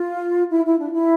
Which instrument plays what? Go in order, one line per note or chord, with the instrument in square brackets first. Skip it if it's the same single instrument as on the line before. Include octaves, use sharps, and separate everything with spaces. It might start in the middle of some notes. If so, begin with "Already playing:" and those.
Already playing: [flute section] F4
E4
E4
D4
E4